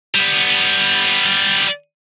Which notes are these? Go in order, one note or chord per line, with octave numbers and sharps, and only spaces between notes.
G3 B3